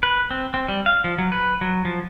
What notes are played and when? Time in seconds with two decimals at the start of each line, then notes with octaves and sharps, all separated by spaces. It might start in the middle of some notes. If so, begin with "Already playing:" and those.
0.03 B4
0.31 C4
0.54 C4
0.68 G3
0.86 F5
1.04 F3
1.18 F#3
1.32 B4
1.61 F#3
1.85 F3